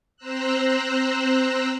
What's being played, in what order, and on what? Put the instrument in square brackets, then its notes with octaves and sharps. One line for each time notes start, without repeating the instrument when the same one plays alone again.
[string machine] C4 C5 A#5 E6 F#6